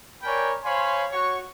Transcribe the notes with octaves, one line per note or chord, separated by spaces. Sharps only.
A#4 C#5 D5 G5 G#5 B5
C5 C#5 F5 G#5 B5 C6
F#4 C#5 C#6